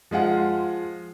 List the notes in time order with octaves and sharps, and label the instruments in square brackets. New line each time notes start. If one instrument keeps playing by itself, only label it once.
[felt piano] F3 G#3 F4 F#5